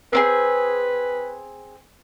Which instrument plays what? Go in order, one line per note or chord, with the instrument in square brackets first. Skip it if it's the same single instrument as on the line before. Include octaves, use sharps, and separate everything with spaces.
[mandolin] C4 D4 G#4 [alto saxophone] B4